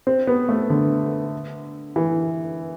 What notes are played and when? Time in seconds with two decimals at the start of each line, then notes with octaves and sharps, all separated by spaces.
0.07 C4
0.27 B3
0.49 A3
0.70 D3
1.96 E3